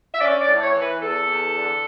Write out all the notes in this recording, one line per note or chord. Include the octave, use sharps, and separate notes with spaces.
E5
C#4 D5
D5
A2
C#5
E3
B4
E2 A4
E2
D3